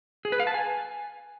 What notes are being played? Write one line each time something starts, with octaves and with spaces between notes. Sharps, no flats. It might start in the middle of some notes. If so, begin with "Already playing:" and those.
G#4
B4
F5
A5
G#5